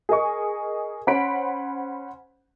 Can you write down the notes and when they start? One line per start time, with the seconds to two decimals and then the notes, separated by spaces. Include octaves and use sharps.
0.09 G#4 A#4 D#5 C#6
1.07 C#4 C5 F#5 B5 B6 D7